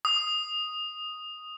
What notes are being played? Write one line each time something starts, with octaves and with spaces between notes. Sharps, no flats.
D#6